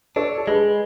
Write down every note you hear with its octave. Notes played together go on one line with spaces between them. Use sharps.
D4 A4 C#5
A4
G#3 G#4 B4